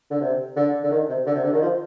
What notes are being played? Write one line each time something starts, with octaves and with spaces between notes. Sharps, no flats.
D3
C3
D3
D3
D#3
C3
D3
C3
D3
D#3
F3